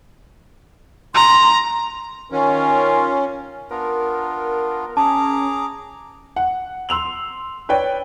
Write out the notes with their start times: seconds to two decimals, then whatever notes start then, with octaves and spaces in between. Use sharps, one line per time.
1.15 A#5 C6
2.32 D#3 C#4 F4 A#4
3.71 B3 D4 F4 A#4
4.97 C#4 G#4 A5 A#5 D6
6.36 F#5
6.89 C6 E6 F7 F#7
7.69 B4 C#5 D5 G5